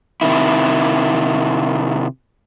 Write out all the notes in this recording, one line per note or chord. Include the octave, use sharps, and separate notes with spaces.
C3 D#3 E4